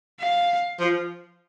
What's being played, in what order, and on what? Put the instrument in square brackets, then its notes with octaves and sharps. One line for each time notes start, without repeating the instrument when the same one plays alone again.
[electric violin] F5
[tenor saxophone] F3